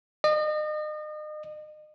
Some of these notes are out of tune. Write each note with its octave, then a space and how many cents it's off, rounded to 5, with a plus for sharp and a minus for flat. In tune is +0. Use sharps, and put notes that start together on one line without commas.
D#5 -35